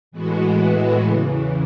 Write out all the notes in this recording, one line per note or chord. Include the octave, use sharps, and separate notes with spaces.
A2 E3 G#3 B3 F#4
E2 C#3 E3